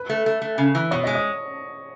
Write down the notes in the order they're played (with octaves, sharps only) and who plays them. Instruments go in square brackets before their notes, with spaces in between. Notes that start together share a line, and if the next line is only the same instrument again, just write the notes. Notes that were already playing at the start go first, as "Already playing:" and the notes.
Already playing: [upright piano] B4
[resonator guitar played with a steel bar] A3
A3
A3
C#3
E3
[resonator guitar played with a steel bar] B2 [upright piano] C#5
[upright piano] D#5
[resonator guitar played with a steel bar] G#3
[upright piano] D#5